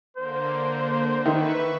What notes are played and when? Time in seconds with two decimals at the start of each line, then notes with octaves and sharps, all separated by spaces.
0.17 D3 A#3 C5
1.26 D#3 B4 E5 C#6